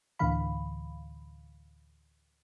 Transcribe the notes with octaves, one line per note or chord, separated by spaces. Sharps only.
D2 A2 D3 E3 F5 B5